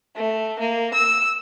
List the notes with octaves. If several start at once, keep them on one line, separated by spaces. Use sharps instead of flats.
A3
A#3
E6